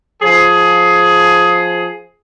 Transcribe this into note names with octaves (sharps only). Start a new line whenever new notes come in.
F3 G#4